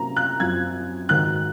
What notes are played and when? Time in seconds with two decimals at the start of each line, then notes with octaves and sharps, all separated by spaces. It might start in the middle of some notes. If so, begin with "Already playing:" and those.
Already playing: C3 F#3 A#3 C#4 A#5
0.16 F#6
0.40 F#2 F3 C4 G#6
1.09 G#2 D#3 F#3 F#6